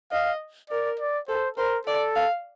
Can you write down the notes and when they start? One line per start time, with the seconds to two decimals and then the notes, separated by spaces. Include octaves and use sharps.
0.12 D#5 F5
0.70 A#4 D5
0.99 D5
1.28 A4 C5
1.57 A#4 C5
1.87 A4 D5
2.15 F5